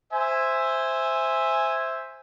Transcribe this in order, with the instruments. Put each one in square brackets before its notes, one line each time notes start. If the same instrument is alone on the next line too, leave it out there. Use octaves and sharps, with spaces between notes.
[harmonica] C5 [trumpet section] E5 G#5